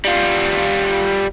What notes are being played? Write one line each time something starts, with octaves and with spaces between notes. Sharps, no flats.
G3 F4